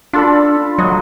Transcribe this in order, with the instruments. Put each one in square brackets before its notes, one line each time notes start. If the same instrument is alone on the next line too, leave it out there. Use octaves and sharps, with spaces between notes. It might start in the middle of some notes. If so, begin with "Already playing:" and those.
[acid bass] D4 [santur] F4 A4 B5
[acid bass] F#3 [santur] D#5